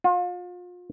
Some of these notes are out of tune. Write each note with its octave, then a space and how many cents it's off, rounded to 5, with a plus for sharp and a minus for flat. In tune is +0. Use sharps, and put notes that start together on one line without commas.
F4 +35